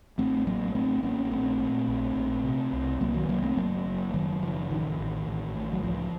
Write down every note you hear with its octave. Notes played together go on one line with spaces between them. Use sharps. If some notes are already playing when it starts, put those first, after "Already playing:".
A1 A3 C4
A1 F#3 A#3
A1 A3 C4
A1 A#3 C#4
A#1 A3 C4
A#2
A#1
A#1
C3
C2
C2 F#3 A#3
D#3 F#3
C2 F#3 A#3
A3 C4
F#1 F#3 A#3
F#1
F#1 D#3 F#3
C#3 F3
A1 D#3
A1
A1
A2
F#3
C#2 F3